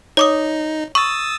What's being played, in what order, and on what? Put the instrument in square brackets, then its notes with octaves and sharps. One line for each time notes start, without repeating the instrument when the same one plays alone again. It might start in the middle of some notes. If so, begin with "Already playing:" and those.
[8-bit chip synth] D#4 [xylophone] C#5 D6 D#6
[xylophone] C#6 [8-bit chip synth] D#6 E6 A6